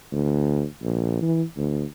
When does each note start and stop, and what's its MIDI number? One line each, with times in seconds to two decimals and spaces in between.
0.12 0.64 38
0.83 1.17 34
1.22 1.43 52
1.57 1.85 38